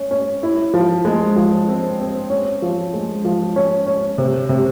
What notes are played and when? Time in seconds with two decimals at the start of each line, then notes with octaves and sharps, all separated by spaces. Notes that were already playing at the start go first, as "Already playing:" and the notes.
Already playing: C#4
0.11 C#4
0.43 E4
0.74 F3
1.05 G#3
1.36 F3
1.68 C4
2.00 C4
2.30 C#4
2.62 F3
2.93 G#3
3.25 F3
3.56 C#4
3.86 C#4
4.18 C3
4.49 C3